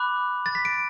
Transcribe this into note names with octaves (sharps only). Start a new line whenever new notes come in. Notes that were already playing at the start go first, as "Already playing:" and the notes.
Already playing: B5 D6 F#6
A6
B6
D7